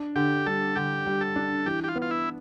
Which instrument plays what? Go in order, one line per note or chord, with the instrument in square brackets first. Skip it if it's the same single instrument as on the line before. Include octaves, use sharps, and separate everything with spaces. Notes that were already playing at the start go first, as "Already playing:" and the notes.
Already playing: [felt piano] D4
[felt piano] D3 [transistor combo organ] G4
[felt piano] G3 [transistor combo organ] A4
[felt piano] D3 [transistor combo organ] G4
[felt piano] G3
[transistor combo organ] A4
[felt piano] D4
[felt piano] E3 [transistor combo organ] G4
[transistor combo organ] G4
F4
[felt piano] B3
[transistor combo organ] F4
E4